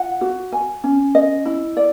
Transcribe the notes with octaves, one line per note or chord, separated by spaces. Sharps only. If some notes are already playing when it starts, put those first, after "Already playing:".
Already playing: F4 F#5
F#4
G#5
C#4
D#5
E4
D5